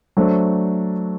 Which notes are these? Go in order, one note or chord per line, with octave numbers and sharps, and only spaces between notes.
F#3 A3 D4 A4 C5